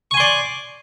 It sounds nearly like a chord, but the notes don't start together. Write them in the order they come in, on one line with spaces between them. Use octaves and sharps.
C#6 G#5 C6 D5